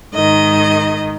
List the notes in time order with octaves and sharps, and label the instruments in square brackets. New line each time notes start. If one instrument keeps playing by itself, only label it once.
[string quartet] G#2 D#3 D#5